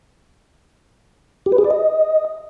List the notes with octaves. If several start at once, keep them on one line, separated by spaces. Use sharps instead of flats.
G4
B4
G#4
D5
D#5